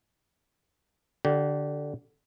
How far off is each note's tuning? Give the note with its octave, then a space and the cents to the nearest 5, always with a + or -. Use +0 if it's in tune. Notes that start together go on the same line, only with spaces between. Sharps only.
D3 +0 G4 -30